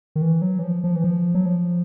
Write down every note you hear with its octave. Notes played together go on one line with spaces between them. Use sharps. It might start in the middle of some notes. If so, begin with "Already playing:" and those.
D#3
E3
F#3
E3
F3
F3
E3
F3
F#3
F3